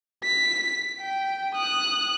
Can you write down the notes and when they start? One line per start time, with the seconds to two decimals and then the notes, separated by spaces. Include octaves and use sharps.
0.24 B6
1.01 G5
1.55 D#6 F#6